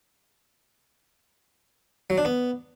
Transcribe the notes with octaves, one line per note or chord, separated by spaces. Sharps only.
F#3
D4
B3